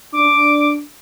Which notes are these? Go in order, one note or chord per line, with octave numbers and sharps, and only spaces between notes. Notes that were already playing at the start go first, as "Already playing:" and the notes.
D4 D6